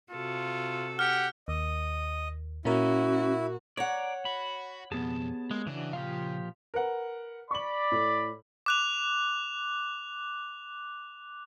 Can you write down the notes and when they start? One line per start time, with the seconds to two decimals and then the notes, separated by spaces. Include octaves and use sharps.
0.11 C3 F4 F#4 A4
0.99 G4 F#5 F6
1.48 D#2 D#5
2.65 A#2 C#4 E4 F#4 A#4
3.77 C#5 D5 F#5 A#5
4.25 F#4 B5
4.92 F2 B2 B3 G4 G#4 A5
5.51 G#3 A#3
5.67 C#3 E3 D4 F#4
5.93 A#2 F3 F4 G4 F5
6.74 A#4 B4 F#5
7.51 D5 B5 C#6 F#7
7.92 A2
8.66 D6 F#6 F7